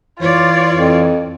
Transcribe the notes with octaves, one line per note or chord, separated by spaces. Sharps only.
E3 F4 C#5 D5
F2